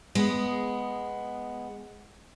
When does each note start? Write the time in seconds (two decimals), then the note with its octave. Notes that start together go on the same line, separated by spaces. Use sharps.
0.15 G#3 B3